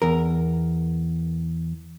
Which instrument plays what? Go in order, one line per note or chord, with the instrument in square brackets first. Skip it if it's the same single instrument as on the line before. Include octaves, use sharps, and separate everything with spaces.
[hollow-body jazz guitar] E2 A#4